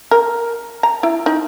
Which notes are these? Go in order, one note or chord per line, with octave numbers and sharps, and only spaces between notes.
A#4
A#5
E4
D#4